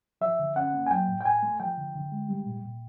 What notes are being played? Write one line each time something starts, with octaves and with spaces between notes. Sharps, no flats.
F3 E5
D3
C#4 F#5
A#3
G#5
F#3 G5
A2
G5
A2 G#5
A3
F3 G5
D3
D3
G#3
G3
A#2
A#2